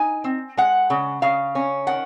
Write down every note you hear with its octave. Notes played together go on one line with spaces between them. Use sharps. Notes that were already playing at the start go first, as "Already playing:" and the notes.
Already playing: D#4 G#5
C4
G#3 F#5
C#3
C#3 F5
C#4
D#3 F#5